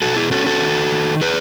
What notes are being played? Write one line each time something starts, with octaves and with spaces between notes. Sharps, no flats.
B2 F#4 A4
E4 G#4
C#4 F#4 A4
F#4 A4
D#3
D#3
G#4 B4